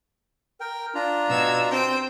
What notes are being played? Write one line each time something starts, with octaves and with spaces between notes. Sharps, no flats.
A#4 G5
D4 F4 A#5
B2 E6 G#6
C4 C5 G5